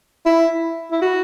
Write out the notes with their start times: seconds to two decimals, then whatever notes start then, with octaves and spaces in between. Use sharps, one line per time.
0.26 E4
0.91 E4
1.01 F#4